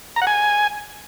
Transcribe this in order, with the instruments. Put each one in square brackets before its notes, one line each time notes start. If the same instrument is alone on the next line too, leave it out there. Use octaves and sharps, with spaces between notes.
[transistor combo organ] A#5
F#5
G#5